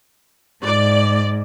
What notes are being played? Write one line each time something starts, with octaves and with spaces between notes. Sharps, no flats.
G#2 D5